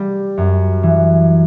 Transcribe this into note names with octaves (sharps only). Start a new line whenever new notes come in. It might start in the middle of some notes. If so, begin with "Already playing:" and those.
Already playing: G3
F#2
E3